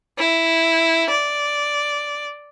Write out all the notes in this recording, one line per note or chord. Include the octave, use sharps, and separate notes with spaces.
E4
D5